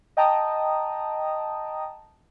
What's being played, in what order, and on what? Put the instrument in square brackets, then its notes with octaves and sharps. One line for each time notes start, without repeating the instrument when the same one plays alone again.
[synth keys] D#5 G5 A5 A#5 D#6